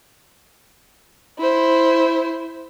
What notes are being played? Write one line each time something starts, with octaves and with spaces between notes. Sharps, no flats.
E4 C5